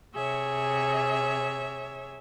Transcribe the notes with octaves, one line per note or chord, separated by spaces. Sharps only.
C3 G#4 C#5 E5